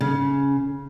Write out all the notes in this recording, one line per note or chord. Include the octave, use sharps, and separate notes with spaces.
C#3